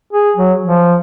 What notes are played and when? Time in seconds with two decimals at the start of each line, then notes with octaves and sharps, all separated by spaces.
0.13 G#4
0.36 F#3
0.64 F3